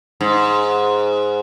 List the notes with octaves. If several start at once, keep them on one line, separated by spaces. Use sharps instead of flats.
G#2